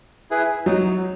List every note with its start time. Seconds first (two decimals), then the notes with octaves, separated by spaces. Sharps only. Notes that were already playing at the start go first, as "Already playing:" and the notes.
0.31 E4 G#4 B4
0.66 F#3 D#4